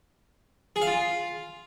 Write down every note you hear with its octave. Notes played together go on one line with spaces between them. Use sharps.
G#4
F5
F4